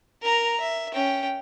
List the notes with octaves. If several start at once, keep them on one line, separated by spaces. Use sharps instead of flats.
A#4 A#5
E5
C#4 G5